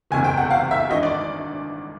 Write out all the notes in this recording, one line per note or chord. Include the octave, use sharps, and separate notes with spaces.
F#1 E2 C3 G#5
G5
F#5
F5
E5
G#1 G2 E3 D#5
D5